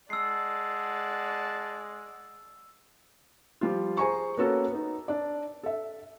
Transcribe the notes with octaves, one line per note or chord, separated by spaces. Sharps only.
G#3 D5 F#5 A5 E6 C7
F3 G3 F4
G#4 C5 G#5 A#5 C#6
A#3 B3 C#4 F#4 A4 A#4
B3 D#4
D4 D5
A4 E5